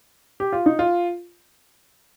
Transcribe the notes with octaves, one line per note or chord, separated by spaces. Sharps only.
G4
F4
D#4
F4